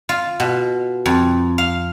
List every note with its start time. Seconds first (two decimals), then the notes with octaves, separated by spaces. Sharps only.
0.09 F4
0.40 B2
1.06 F2
1.58 F5